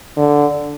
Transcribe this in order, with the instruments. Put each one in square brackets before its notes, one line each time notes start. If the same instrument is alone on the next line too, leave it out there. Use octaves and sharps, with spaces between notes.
[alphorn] D3